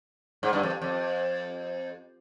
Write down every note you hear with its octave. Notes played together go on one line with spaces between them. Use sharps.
G#2
G2
F2
F2